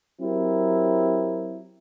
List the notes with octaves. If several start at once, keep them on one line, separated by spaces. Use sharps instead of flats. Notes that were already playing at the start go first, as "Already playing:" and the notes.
F#3 C4 E4 G4 A#4